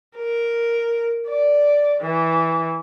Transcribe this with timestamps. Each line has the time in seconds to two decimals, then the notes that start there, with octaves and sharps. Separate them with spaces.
0.18 A#4
1.28 D5
2.00 E3